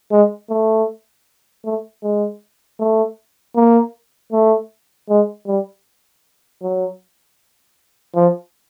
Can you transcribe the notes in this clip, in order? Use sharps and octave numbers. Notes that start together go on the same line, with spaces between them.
G#3
A3
A3
G#3
A3
A#3
A3
G#3
G3
F#3
F3